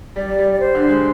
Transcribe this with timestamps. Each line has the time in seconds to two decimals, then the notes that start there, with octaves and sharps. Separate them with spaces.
0.16 G3 D5
0.39 G3
0.52 D5
0.60 C5
0.75 D3
0.89 G#3